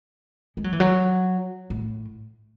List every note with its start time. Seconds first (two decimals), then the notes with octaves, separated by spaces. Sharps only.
0.57 G#3
0.64 F#3
0.73 E3
0.80 F#3
1.70 A2